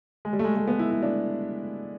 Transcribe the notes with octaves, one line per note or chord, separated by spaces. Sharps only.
G#3
G3
A3
G#3
A3
B3
E4
E4
D4